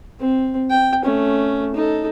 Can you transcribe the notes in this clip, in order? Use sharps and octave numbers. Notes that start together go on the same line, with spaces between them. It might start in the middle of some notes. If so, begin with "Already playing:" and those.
C4
G5
A3 C#4
D#4 A4